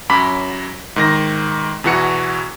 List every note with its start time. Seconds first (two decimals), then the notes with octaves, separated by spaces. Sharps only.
0.09 F#2 F#3 B5 D6 B6
0.96 G#2 D#3 A#6
1.84 E2 B2 E3 F#4 C#7